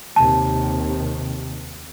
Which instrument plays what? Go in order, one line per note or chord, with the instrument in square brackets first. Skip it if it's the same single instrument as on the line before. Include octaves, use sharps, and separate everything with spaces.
[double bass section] D#2 C3 D#3 [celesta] A5